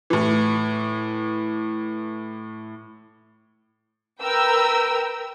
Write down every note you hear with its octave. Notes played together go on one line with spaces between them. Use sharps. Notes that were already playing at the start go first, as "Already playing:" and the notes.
A2 E3
A#4 B4 G5 E6